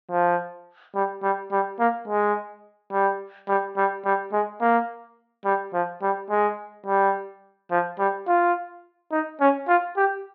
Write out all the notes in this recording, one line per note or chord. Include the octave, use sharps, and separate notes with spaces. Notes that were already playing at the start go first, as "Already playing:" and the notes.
F3
G3
G3
G3
A#3
G#3
G3
G3
G3
G3
G#3
A#3
G3
F3
G3
G#3
G3
F3
G3
F4
D#4
C#4
F4
G4